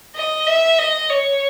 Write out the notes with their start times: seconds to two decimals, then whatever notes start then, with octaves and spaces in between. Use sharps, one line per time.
0.16 D#5
0.47 E5
0.79 D#5
1.10 C#5